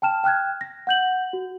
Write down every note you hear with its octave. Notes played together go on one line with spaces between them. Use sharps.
G5 A5 F6 E7
G5 F6 F#6 G#6
A#6
F#5 G6 F#7
F#4